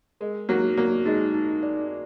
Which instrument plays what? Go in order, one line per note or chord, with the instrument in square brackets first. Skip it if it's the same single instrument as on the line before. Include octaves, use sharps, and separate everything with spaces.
[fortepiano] G#3 [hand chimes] A#4
[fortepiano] F#3 A#3 [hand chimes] D#4
[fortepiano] F#3 A#3 [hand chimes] D5
[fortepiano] G#3 [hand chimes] D#4
[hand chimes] D#4
D5